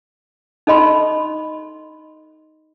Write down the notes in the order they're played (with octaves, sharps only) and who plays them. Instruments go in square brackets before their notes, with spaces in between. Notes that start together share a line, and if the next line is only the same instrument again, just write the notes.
[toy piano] D#4 A4 D#5 B5 C6